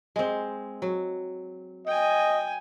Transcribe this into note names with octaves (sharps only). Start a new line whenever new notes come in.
G#3 C4
F#3
D#5 G5 G#5